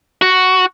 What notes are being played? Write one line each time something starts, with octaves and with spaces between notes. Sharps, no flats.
F#4